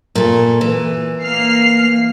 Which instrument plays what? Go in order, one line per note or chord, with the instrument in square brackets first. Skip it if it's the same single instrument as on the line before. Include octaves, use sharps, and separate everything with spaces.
[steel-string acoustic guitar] A#2 A3
E3
[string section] A#3 F6 C7